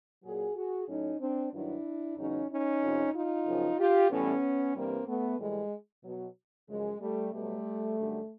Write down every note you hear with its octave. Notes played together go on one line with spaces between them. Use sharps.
A#2 F#3 F#4 G#4
F#4 G#4
A2 F#3 C#4 D#4
C4 D4
G2 D#3 F#3 D4 E4
E2 C#3 F#3 C#4 D#4
C#4 D#4
F2 C3 F3
D#4 F4
F#2 C#3 F3
F4 G4
A2 E3 G3 B3 C#4
G2 E3 G3 A#3 C4
A3 B3
A2 E3 G3 G#3
B2 F#3
F#2 C#3 F3 G#3
G3 A3
B2 F#3 G3 A3
F#2 D3 G3